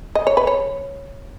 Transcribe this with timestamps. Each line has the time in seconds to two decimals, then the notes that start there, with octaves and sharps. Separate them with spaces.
0.15 D#5
0.27 C#5
0.37 B4
0.47 C#5